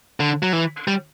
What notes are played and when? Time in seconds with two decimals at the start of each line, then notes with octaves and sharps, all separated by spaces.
0.20 D3
0.43 F#3
0.53 E3
0.88 G3